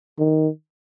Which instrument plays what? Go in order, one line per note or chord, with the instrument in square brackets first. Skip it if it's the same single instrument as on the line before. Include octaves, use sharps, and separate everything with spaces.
[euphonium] D#3